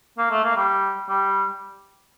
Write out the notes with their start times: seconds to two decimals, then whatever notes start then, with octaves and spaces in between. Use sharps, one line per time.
0.18 A#3
0.31 A3
0.44 A#3
0.56 G3
1.09 G3